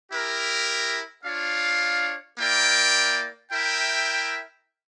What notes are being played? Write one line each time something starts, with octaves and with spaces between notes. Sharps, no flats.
E4 G4 A#4
D4 F4 C#5 F5
A#3 E4 A#4 D5 G5
E4 A#4 E5 G5